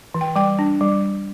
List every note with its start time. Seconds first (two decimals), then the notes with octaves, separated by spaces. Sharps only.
0.14 E3
0.21 G5
0.36 G3 G5
0.59 D4
0.81 G3